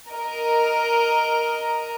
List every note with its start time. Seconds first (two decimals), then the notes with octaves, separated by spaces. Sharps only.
0.10 A#4 D#5